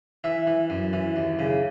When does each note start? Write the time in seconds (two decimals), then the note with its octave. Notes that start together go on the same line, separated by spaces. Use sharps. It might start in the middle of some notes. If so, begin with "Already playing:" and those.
0.24 E3 E5
0.47 E3
0.70 F#2
0.93 E3
1.16 D#2
1.39 C#3